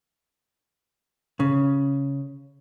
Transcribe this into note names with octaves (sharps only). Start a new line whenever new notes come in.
C#3